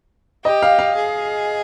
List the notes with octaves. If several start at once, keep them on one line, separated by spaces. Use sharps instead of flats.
G4 D#5
F5
F5
G#4